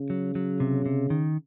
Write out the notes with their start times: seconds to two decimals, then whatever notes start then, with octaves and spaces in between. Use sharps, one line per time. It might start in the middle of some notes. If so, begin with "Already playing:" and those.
Already playing: C#3
0.10 F#3
0.35 F#3
0.60 C3
0.86 C3
1.10 D#3